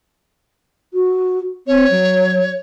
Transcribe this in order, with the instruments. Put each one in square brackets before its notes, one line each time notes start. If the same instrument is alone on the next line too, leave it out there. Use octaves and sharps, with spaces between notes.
[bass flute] F#4
[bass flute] C4 [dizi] C#5
[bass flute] F#3